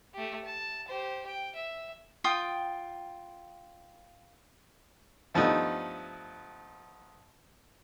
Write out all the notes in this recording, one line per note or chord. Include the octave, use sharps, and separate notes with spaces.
A3 G4
A5
G4 C5
G5
E5
F4 G5 D#6
G2 F3 A3 B3 D#4